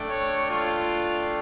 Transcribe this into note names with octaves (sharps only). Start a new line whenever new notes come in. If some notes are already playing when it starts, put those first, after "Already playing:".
Already playing: A3 D4 A4 D5 G5
C#5
F4